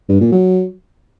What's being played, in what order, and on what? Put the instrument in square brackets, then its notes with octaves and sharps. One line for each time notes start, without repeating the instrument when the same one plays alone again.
[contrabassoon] G2
A#2
F#3